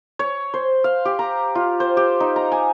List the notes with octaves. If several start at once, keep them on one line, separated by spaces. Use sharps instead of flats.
C#5
C5
F5
G4
A#5
F4
C5
G4
D#4
A#5
G#5